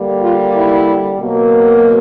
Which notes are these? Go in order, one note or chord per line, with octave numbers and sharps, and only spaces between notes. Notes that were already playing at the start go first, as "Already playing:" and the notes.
Already playing: D3 G3 A#3
F4
E4
B2 F#3 A#3